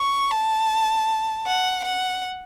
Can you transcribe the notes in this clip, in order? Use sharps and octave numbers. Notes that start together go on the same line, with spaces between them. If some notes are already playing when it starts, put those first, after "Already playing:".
Already playing: C#6
A5
F#5
F#5